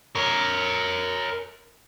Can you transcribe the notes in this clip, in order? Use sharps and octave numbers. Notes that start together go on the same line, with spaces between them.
A#4 C#5